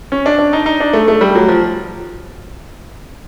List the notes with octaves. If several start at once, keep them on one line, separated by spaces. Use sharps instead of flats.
C#4
D4
D4
D#4
D#4
D4
A3
A3
G3
F#3
F3